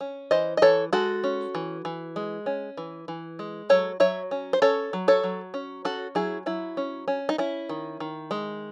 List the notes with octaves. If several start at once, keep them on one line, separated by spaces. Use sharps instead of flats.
C#4
E3 C5 D#5
D#5
E3 A4 C#5
G#3 F#4 A4
C#4
E3
E3
G#3
C#4
E3
E3
G#3
F#3 A4 C#5
F#3 C#5 E5
C#4
C5
C#4 A4 C#5
F#3
A4 C#5
F#3
C#4
C#4 F#4 A4
F#3 E4 G#4
F#3 E4
C#4
C#4
D#4
C#4 E4
D#3
D#3
G#3